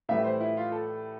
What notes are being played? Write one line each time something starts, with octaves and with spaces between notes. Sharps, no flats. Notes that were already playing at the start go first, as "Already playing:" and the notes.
A2 E3 G3 E5
C5
E4
F4
A4